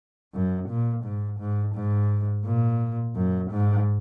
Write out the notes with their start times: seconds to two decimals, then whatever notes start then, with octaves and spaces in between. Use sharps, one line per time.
0.34 F#2
0.69 A#2
1.04 G#2
1.39 G#2
1.75 G#2
2.45 A#2
3.16 F#2
3.51 G#2